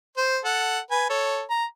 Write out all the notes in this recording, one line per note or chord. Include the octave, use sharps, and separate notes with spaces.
C5
A4 F#5
B4 G#5
A4 C#5
A#5